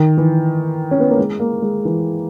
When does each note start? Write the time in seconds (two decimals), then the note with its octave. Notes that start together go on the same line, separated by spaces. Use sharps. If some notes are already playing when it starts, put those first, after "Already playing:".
Already playing: D#3
0.18 E3
0.91 C#4
1.00 B3
1.10 A#3
1.18 G#3
1.40 A#3
1.62 G#3
1.85 E3